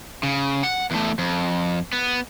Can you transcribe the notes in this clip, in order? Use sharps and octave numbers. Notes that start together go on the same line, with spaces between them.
C#3
F#5
E2 A3
F2
B3